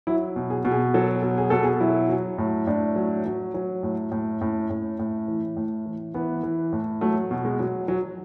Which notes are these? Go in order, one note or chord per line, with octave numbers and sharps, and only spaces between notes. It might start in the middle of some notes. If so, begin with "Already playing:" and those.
F#3 E4
B2
G#4
B2
G#4
F#3 A4
B2
G#4
B2 A4
G#4
F#3 E4
F#3
A2
A2 D4
F#3
F#3
F#3
A2
A2
A2 C#4
A2
A2
E3
A2
E3
E3 B3
E3
A2
F#3 A3
B2
G#3
F#3
F#3